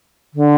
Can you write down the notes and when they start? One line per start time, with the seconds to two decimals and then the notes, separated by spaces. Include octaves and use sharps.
0.34 D3